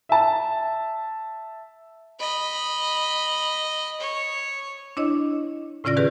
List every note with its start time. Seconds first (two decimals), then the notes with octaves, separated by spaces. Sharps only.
0.09 E5 A5
2.20 D#5 B5
4.01 C#5
4.97 D4 E4 C#5 D#5
5.84 A2 C#3 C#4 F4 D5 A#6
5.97 D#3 G4 G#4 B4